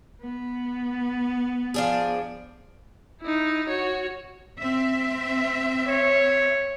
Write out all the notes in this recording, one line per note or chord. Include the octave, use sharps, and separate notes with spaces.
B3
F3 D4 G#4
D#4 E4
F#4 C#5
C4 E5
C#5